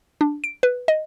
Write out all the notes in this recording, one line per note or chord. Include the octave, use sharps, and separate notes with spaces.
D4
D7
B4
D#5